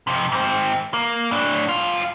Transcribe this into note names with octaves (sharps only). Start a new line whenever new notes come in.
F2 C3
G#2 C4
A#3
A2 D4
G2 F4